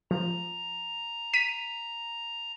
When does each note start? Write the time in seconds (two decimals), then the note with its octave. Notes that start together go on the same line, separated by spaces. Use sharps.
0.11 F3 A#5
1.33 B6 D#7